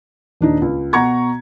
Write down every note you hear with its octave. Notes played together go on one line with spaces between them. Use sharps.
D#1 D4 D#4
C#2
B2 F#5 A#5 C#6 G#6